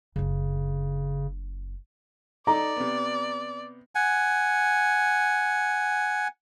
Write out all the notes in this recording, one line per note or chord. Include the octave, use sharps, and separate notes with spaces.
F#1 C#3 D4
D#4 A4 D5 A#5 D6
C3 B3
F#5 G#5